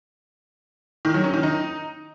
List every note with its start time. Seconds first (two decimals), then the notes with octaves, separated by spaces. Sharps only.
1.05 D#3
1.14 F#3
1.24 C#4
1.34 D#3
1.43 D#4